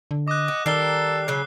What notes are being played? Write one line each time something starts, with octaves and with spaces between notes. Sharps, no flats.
D3
D#5 D6 F#6
F#4
D#3 G3 A4 A#4 C7 G7
C#3 F#3 F#6